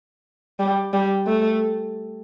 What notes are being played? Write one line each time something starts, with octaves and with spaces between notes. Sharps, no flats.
G3
G3
A3